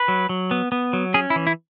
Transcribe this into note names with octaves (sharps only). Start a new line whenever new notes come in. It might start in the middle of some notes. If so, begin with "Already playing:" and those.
Already playing: B4
F#3
F#3
B3
B3
F#3
C#4 G#4
E4
E3
E4